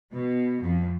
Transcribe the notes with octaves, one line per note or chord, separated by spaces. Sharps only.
B2
F2